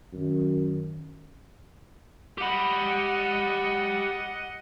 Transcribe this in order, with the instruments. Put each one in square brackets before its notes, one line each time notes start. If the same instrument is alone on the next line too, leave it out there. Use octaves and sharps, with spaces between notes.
[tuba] F#2 [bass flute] D#3
[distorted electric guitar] G4 B5 [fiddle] D#5 F#5